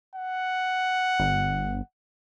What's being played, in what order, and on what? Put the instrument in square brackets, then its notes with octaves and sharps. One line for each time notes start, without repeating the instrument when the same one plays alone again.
[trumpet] F#5
[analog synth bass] G1